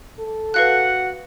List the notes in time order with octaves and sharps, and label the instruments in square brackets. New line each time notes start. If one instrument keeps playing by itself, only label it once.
[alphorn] A4
[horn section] F#4 F#5 [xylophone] B4 F5 F#6